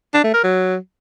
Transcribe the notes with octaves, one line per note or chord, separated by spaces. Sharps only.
D4
A3
A#4
F#3